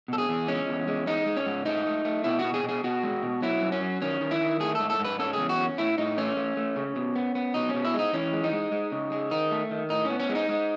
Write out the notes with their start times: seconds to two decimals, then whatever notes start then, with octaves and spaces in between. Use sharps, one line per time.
0.08 B2 A4
0.18 G#4
0.29 E2
0.48 G#3 C#4
0.68 E2
0.88 G#3
1.07 G#3 D#4
1.26 G#3
1.37 C#4
1.46 G#2
1.66 A3 D#4
1.86 A3
2.05 A3
2.24 B2 E4
2.39 F#4
2.44 B2
2.54 G#4
2.64 B2
2.69 G#4
2.84 B2 F#4
3.03 G#3
3.22 B2
3.42 F#3 E4
3.62 F#2
3.72 C#4
3.81 F#3
4.02 D#3 C#4
4.21 D#3
4.31 E4
4.41 D#3
4.60 A3 G#4
4.75 G#2 A4
4.90 A4
4.99 G#2
5.05 B4
5.19 C#4 A4
5.33 E2 G#4
5.49 F#4
5.59 C#4
5.78 A2 E4
5.98 A2 D#4
6.18 A3 C#4
6.37 A3
6.57 A3
6.76 C#3
6.96 B2
7.15 B3
7.35 B3
7.54 B2 D#4
7.69 C#4
7.74 B2
7.85 E4
7.94 G#3
7.99 D#4
8.14 E3 C#4
8.33 G#3
8.44 D#4
8.53 G#3
8.72 G#3
8.92 C#3
9.12 G#3
9.31 D#3 D#4
9.51 A3
9.71 D#3
9.90 A2 D#4
10.05 B3 C#4
10.20 C#4
10.29 G#3
10.35 D#4
10.49 G#3